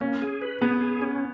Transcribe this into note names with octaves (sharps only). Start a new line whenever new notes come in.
A#3 C#4
G#4
B4
B3 G#4
G#4
C#4